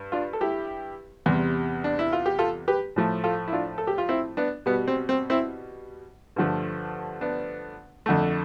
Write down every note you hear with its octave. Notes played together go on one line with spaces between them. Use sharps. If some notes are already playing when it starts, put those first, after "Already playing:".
Already playing: G2
D4 F4
A4
E4 G4
E2 C3 G3
D4
E4
F4
G4
F4 A4
G4 B4
A2 F3 A3
F4 A4
E4
D4 F4
A4
G4
F4
C4 E4
B3 D4
B2 G3 B3
C4
C4
C4 E4
G2 D3 F3 A3
B3 D4
F2 D3 A3